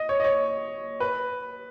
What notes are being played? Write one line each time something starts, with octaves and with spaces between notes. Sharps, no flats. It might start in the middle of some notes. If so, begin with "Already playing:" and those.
Already playing: D#5
C#5
D#5
C#5
B4